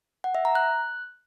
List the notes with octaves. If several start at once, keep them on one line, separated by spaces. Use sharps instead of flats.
F#5
E5
A#5
F#6